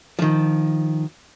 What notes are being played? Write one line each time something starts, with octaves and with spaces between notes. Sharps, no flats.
D#3 F3